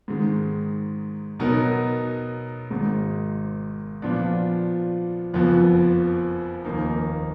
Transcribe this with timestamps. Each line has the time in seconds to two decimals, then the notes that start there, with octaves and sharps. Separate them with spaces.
0.08 G#2 D#3 G#3
1.39 B2 F#3 B3 D#4 A#4
2.70 G#1 G#2 D#3 G#3 D#4
4.02 A#2 F3 B3 D4
5.34 F#1 F2 F3 B3
6.65 F1 D#2 D#3 A#3 D#4